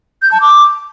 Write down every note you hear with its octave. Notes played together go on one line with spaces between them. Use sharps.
G6
A5
D6